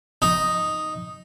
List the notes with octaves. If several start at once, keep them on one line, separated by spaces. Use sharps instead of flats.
D#4